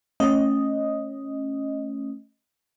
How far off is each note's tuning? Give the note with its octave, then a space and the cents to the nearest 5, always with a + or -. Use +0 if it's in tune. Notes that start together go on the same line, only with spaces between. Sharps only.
A3 +0 C#4 -15 D#5 +0